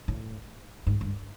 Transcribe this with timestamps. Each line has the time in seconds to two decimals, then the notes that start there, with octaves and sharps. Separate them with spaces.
0.08 A2
0.87 G#2
1.01 G2